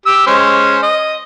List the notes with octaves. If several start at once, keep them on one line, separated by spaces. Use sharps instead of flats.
G4 E6
G#3 C#4 C5
D#5